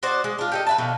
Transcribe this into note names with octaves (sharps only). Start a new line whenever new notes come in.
F#4 C5 D5 D#5
G#3
D4 F4
G4 A4 D#5
B4 E5 A5
B2 D3 F3